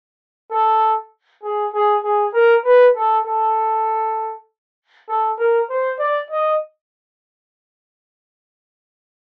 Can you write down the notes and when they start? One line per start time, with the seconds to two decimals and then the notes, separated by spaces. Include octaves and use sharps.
0.51 A4
1.43 G#4
1.73 G#4
2.03 G#4
2.33 A#4
2.64 B4
2.95 A4
3.25 A4
5.09 A4
5.38 A#4
5.69 C5
5.99 D5
6.30 D#5